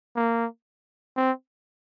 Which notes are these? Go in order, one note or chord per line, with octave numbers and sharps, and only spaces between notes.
A#3
C4